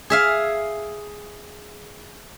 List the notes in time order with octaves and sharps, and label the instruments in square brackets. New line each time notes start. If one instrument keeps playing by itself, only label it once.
[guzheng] G#4 E5 F5